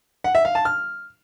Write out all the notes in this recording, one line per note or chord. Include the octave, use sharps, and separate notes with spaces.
F#5
E5
F5
A5
F6